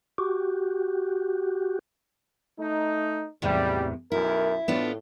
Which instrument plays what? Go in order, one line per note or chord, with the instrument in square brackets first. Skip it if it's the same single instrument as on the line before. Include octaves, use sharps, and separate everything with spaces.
[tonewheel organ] F#4 G4
[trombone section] A3 D#4
[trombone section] G#1 G3 [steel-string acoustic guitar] E2 A2 C3
[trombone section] B1 F#2 A#4 [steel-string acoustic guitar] E4
[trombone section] A2 [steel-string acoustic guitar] B3 D4 F4